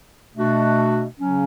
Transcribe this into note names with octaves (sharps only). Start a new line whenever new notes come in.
B2 A3 D4 F#4
C#3 F#3 C#4